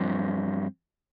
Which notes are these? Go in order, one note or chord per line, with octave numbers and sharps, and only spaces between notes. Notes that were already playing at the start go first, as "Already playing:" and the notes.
Already playing: G2 F3 C4